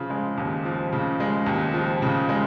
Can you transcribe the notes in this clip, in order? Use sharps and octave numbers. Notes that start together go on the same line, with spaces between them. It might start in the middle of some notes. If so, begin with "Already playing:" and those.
Already playing: C#3 F3
G#3
D#2
F3
C#3
G#3
D#2
F3
C#3
G#3